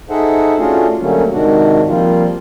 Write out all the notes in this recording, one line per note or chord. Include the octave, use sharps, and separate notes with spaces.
D#4 G#4 A4 C5 E5 F#5
A3 C#4 D4 F4 F#4 G#4
D3 F#3 G3 A3 A#3 C#4
G#2 C3 D#3 D4 F#4
F3 G3 A#3 C4 F4